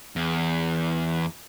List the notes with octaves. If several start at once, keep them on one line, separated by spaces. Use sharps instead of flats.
E2